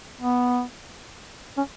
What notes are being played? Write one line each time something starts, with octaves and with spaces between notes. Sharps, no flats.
B3
C#4